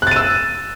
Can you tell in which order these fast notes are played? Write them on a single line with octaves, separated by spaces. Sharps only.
F#6 A6 D#7 E6